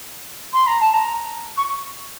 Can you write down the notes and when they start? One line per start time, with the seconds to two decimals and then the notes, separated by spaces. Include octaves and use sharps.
0.53 C6
0.66 A#5
0.80 A5
0.93 A#5
1.57 C#6